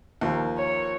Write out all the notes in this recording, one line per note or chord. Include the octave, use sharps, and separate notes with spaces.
D#2 F3 A#3 F5
C#5